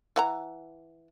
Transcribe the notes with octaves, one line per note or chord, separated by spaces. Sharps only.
E3 F#5 A#5